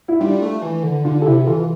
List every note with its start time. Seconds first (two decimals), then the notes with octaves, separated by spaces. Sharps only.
0.08 E4
0.20 G3 D4 F4
0.42 A3
0.62 E3
0.83 D3
1.04 D3 D4 F4
1.22 A4
1.26 C3 E4 G4
1.47 E3 F4 A4